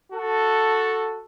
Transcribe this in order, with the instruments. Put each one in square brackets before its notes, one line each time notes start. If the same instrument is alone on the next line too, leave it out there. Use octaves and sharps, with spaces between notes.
[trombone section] F#4 A4